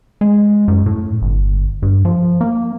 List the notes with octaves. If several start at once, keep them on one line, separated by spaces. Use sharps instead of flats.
G#3
F#2
A2
G1
G2
F3
A#3